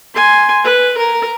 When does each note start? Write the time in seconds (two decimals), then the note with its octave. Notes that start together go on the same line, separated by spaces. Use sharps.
0.15 G#5 C6
0.64 B4
0.98 A#4